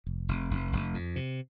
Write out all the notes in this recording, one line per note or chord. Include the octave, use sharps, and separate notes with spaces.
F1
F1
F1
F1
F2
C3